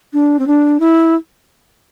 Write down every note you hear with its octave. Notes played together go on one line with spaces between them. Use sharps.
D4
C4
D4
E4